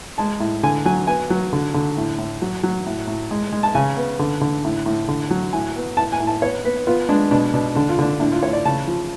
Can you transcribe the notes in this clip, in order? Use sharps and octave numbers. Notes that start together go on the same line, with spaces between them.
G#3 A5
A2
D3 G#5
F#3 G#5
B3 G#5
F#3
D3
D3
A2
A2
F#3
F#3
A2
A2
G#3
G#3
A5
C#3 G#5
B3
D3
D3
A2
A2
D3
F#3
A2 G#5
B3
A2 A5
G#5
A2
A5
B3 C#5
B3 B4
B3 F4
G#3 D4
B2 D4
B2 D4
D3 D4
F4
D3 D4
A2 D4
F4
A2 C#5
D5
C#3 A5
F3